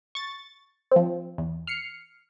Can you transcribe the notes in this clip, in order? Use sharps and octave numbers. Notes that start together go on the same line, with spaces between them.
C#6 A6
F3 C4
E2
F6 C7 C#7